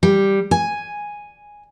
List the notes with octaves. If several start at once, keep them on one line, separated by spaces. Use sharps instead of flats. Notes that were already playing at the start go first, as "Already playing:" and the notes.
G3
G#5